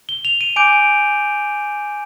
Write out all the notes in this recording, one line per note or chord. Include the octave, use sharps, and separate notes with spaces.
G7
F7
D#7
G#5 D6 G6 D7